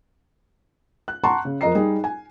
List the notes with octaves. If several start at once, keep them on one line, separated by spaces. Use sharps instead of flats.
F#6
F#5 A5 A#5 C6 C#6
C#3
F2 A#4 D#5 A#5 C7
G3 D#4 G#4
G#5